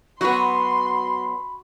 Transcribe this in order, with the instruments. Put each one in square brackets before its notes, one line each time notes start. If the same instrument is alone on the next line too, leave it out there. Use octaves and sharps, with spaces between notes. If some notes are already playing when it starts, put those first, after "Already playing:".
[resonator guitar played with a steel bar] F#3 B3 [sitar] F#4 [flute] B5 [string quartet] C6